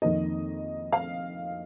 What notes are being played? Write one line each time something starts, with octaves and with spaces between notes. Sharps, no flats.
F2 D#3 A#3 D#5
F5